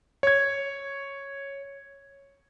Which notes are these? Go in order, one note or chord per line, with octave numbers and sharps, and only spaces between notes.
C#5 G#6